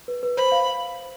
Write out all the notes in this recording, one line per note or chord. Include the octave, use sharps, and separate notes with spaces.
B4
B4
C5 B5
F5